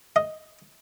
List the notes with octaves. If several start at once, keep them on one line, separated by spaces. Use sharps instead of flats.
D#5